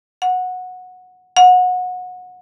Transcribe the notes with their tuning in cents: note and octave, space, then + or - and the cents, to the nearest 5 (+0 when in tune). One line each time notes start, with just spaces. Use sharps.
F#5 -15
F#5 -25